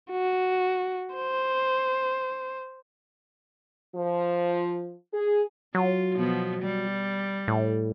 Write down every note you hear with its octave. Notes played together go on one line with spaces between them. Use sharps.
F#4
C5
F3
G#4
F#3 F4
B2 F3 B3
G3
A2